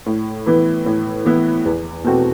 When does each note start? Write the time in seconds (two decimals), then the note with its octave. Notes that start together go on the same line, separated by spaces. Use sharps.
0.06 A2
0.46 E3 B3 E4
0.86 A2
1.25 E3 B3 E4
1.65 E2
2.04 B2 A3 C4 F#4